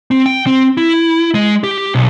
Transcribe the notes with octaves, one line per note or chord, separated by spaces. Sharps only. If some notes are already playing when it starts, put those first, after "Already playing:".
C4
G5
C4
E4
G#3
G4
B1